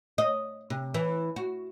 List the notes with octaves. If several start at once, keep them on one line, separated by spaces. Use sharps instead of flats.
D#5
C3
E3
F#4